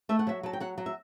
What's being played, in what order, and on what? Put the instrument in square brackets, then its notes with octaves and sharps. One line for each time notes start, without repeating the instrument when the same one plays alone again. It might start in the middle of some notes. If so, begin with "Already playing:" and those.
[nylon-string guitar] A3 E5
F#5
F#3 E5
F#3 A5
G5
F#3 F#5
F#3
E5